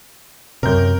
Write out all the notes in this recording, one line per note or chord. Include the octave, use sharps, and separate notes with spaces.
F#2 C3 A#4 G6